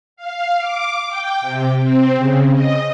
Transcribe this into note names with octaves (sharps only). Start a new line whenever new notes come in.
F5
D6
G5
C3
C4
C#3
D#5